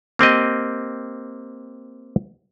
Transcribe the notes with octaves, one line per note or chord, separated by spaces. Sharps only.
A#3 C4 G4 D#5